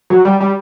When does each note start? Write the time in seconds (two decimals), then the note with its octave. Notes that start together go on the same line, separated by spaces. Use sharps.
0.10 F#3
0.25 G3
0.40 G3